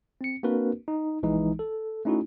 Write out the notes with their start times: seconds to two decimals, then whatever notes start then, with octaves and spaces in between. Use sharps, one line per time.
0.21 C4 C#7
0.43 A#3 C4 D4 F#4 A#4 B4
0.88 D#4
1.23 A#1 E3 G#3 D#4
1.59 A4
2.05 A3 C#4 D#4 E4 F#4